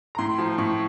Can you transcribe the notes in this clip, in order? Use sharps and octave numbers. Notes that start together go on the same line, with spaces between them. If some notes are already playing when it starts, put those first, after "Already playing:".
A#5
A2 C6
F3
A2 C#6